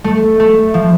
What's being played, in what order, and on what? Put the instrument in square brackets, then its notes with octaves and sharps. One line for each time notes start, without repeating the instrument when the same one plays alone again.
[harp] A3
A3
F3